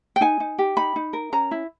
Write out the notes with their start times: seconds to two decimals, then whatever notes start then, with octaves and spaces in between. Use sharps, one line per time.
0.16 G5
0.21 D#4 G#5
0.40 D#4
0.58 G4
0.77 D#4 B5
0.96 D#4
1.13 A#4
1.32 C#4 A#5
1.51 E4